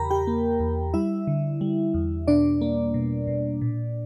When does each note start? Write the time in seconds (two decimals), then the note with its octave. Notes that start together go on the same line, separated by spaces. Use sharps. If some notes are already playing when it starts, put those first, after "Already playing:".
Already playing: E2 C#3 G4 A#4 A#5 B5
0.10 G4 G5
0.27 A#3
0.60 E2
0.94 G3 E4 E5
1.27 D3
1.61 G3
1.94 E2
2.27 B2 D4 D5
2.61 A#3
2.94 B2
3.27 B2
3.62 A#2